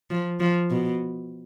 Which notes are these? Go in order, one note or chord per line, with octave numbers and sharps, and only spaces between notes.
F3
F3
B2